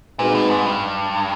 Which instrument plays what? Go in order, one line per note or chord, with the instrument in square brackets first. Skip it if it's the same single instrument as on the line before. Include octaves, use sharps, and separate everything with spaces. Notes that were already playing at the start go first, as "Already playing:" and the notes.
[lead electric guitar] A#2 [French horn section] G#3 C4 D#4 F#4 B4
[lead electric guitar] A2
G#2
G2